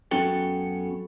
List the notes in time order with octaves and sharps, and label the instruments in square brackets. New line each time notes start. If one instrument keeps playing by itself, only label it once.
[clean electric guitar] F#2 B3 C#4 F#4 A4 G5